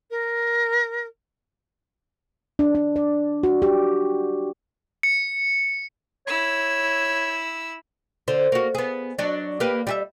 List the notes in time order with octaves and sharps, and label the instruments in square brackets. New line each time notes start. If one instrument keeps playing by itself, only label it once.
[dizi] A#4
[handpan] D4
D4
D5
F#4
G4
[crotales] C#7
[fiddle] E4 E6 [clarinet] C#5
[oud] D3 C5
A#3 F#4
B3 G#4
F#3 D4
A#3 G4 B4
G3 G#4 E5